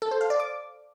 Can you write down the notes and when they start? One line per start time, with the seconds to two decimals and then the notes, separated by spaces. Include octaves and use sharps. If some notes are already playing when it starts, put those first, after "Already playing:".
0.02 A4
0.11 C5
0.21 F5
0.30 D5
0.40 D6